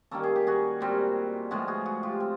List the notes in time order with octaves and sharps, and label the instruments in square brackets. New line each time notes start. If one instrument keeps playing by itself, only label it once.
[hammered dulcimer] D#3 G3 A#3 C#4 A4
G#4
G4
F#4 G#4
A#2 G3 C4
A2 F3 G#3 B3 F#4 G#4
F#4 G#4
F#4 G#4
F4 G4
C4